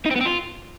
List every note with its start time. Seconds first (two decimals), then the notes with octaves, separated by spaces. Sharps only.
0.06 D#4
0.11 C4
0.16 B3
0.21 C4
0.26 F4